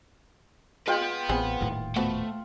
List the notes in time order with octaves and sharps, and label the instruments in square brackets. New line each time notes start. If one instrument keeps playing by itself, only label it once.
[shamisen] G#3 [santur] F4 G5 [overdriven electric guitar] B4 F#5
[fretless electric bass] A1 [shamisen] B3 C4 G#4
[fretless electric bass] D#1 D#2 A2
[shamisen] F3 B3 F#4 [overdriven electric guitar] A3